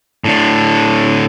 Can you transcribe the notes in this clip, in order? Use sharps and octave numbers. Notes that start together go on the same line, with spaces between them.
A2 D3